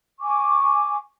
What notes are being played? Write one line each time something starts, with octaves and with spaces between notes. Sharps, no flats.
G#5 C#6 D6